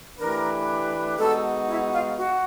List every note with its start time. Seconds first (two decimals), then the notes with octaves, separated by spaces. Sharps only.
0.18 E3 A3 D4 G4 A#4 B4
1.17 G#3 B3 D#4 F#4 A4
1.67 E4
1.91 F4
2.17 F#4